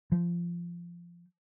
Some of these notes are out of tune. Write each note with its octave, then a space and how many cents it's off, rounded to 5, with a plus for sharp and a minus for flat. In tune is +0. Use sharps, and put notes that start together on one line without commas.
F3 -15